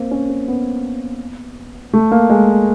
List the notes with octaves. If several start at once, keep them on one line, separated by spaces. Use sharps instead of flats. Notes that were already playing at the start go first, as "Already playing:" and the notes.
Already playing: A#3 C4
C#4
C4
B3
A3
A#3
G#3